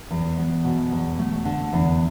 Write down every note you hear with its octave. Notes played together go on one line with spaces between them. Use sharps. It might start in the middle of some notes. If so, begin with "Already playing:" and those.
E2
B3
B2
E2
A3
D3
E2